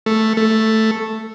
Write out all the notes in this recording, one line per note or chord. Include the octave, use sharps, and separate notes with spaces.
A3
A3